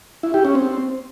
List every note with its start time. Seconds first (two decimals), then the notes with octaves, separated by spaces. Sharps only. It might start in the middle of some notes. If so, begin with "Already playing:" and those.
0.23 E4
0.34 G4
0.45 C#4
0.55 C4